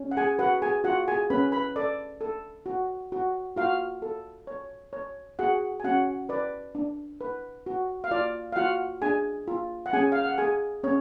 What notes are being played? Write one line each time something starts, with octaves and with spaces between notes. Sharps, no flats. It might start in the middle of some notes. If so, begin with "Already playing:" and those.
Already playing: C#4
F#5
G#4 G#5
F#4 B4 F#5
G#4 G#5
F4 F#4 F#5
G#4 G#5
C#4 B4 B5
B4 B5
A4 D5
A4
F#4
F#4
F4 F#4 F5
A4
C#5
C#5
F#4 G#4 F#5
G#5
C#4 F#4 F#5
B4 D5
D4
B4
F#4
F5
F4 D5
F5
F4 F#4 F#5
D4 G#4 G#5
F4
F#5
C#4 G#4 G#5
F5
F#5
G#4 G#5
C#4 C#5